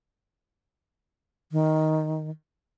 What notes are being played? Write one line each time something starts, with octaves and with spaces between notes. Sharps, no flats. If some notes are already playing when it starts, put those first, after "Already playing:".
D#3